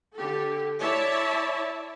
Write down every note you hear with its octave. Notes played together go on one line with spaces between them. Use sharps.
D3 G4 A4
E4 C#5 D5 E5 A5